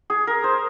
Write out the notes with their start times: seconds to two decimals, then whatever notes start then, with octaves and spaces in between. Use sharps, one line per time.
0.10 G#4
0.27 A#4
0.44 C5